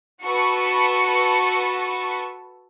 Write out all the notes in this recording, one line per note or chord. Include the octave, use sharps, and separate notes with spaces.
F#4 A4 B4 A5 C#6